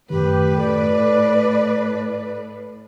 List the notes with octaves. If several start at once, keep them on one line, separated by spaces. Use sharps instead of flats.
F#2 A2 D#3 G4 B4
A4 D5